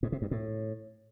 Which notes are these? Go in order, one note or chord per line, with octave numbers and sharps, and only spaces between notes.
G#2
C3
G2
A2